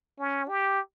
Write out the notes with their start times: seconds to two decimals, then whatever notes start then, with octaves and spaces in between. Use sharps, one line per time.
0.19 C#4
0.49 G4